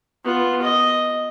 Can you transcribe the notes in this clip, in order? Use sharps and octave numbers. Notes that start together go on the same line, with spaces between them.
B3 F4
D#5